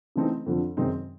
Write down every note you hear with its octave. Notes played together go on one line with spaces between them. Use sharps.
C#3 E3 A3 C4 D#4
F2 D3 F3
F#2 D#3 G#3 C4 D#4